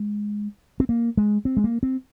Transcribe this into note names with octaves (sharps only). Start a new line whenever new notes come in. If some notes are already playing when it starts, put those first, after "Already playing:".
Already playing: G#3
C4
A#3
G#3
C4
G#3
A#3
C4